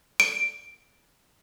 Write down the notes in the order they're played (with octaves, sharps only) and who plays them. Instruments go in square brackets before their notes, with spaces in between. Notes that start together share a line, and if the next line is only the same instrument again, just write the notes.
[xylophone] D7